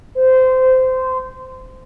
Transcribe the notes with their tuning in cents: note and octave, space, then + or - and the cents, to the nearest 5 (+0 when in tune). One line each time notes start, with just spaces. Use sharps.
C5 -20